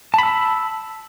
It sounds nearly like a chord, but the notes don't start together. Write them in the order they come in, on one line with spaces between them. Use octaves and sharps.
A5 B5 E6